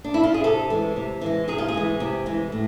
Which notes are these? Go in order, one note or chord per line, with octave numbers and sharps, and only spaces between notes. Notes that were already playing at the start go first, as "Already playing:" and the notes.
D4
E4
F4
G#4
C3 A4
E3 G#3
C3
E3 G#3
C3 G#4
F4
G#4
E3 G#3
C3
E3 G#3
A2